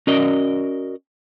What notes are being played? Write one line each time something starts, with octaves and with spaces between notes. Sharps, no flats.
C#4 F#4 A#4 D5 D#5